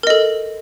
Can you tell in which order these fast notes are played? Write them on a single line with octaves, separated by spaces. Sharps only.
A#4 D#5 A4